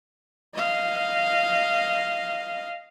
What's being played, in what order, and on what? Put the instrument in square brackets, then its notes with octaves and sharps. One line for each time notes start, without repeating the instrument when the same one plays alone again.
[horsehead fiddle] D#5 F5